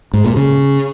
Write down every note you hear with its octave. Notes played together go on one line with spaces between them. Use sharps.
G#2
A#2
C#3